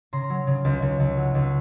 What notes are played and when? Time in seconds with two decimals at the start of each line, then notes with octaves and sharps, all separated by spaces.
0.13 C#3 A#5 C6
0.30 F#3
0.47 C#3
0.65 C#2
0.82 C#2
1.00 C#2
1.17 F#3
1.35 C#2